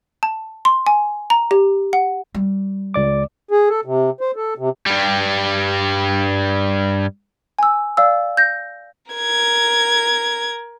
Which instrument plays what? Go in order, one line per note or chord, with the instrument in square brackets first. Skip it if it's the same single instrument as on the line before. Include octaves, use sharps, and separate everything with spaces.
[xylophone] A5
C6
G#5
A#5
G4
F#5
[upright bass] G3
[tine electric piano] C#2 D5 D6
[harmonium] G#4
A4
C3
C5
A4
C3
[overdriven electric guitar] G2 G3
[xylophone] G#5 E6
D5 F5 E6
G6 A#6
[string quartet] A#4 G#6